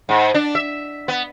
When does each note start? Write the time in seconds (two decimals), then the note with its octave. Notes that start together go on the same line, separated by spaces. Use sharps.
0.09 G#2
0.34 D4
0.55 E5
1.08 B3